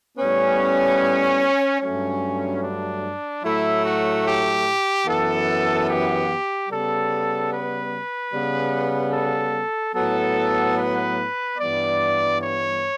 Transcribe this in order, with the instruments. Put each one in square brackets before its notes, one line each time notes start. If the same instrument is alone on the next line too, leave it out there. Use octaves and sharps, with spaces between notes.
[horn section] A2 G3 B3 C#4
G2 F#3 A3 C#4
D4
A2 F#3 A3 E4
F#4
G4
F#2 E3 B3 A4
G4
C#3 G3 B3 A4
B4
C#3 G3 B3
A4
A2 F#3 B3 A4
B4
G2 E3 G3 B3 D5
C#5